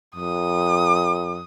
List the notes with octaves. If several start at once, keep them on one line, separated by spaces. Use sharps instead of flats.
F2 D#6